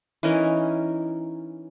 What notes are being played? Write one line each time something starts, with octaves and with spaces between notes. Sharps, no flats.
E3 C#4 D#4 A#4